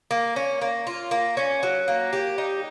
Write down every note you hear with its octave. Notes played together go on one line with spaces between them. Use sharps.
A#3
C#4
A#3
F4
A#3
C#4
F#3
A#3
G4
D#4